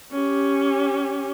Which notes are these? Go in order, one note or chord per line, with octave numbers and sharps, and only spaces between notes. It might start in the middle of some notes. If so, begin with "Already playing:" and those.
C#4 G4